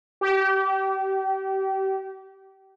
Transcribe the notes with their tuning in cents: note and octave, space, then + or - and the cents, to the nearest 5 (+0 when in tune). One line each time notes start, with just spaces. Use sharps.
G4 -30